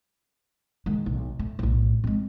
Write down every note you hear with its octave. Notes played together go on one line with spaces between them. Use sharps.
D#3 G#3
B1
A3
B1 A2
G#3 C4